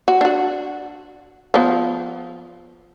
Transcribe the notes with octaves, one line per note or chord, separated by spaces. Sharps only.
F#4
D4 F#4
F3 B3